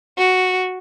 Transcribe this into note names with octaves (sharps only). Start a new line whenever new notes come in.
F#4